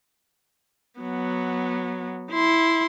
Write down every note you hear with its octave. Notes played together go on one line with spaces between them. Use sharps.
F#3 B3
E4 C6